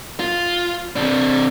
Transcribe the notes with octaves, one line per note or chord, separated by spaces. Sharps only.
F4
C3 D4